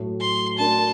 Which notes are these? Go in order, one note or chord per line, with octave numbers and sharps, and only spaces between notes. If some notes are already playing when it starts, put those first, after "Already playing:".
Already playing: A2 F#3 A3
C6
A3 D4 F#4 A#4 A5